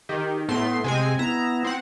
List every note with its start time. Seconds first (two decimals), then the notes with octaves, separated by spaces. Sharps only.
0.09 D#3 G4
0.48 A2 A3 B3 C6
0.84 C3 G#3 C4 G#5
1.19 B3 E4 A#5
1.64 C4 F#5